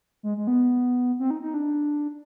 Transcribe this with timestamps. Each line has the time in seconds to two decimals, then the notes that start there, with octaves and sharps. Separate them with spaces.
0.23 G#3
0.37 G#3
0.47 B3
1.19 C4
1.30 D#4
1.42 D#4
1.54 D4